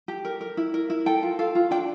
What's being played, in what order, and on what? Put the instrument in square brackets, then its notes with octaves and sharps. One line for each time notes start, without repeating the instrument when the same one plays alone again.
[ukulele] G4
A#4
A#4
E4
A#4
E4
A4 G5
F4
A4 F5
F4
D4 G5